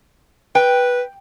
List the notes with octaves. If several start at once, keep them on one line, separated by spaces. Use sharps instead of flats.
B4 G5